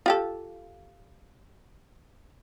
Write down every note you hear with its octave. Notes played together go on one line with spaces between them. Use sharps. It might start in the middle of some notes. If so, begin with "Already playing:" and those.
F4 G4 A4